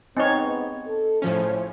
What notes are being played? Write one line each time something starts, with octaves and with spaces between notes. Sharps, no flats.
G#2 B3 C4 D#4 C#5 D#5
A4
A2 C#3 F3 A3 C#4 C5